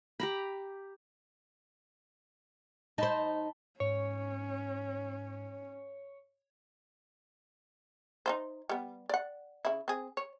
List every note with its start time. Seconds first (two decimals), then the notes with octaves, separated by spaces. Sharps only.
0.20 G4 A#5 B5
2.98 D#4 C5 A5 B5
3.80 G#2 C#4 C#5
8.26 D#4 F4 C5
8.69 G3 B3
9.09 D5 F#5
9.65 C#3 E4
9.88 C4 G#4
10.17 C#5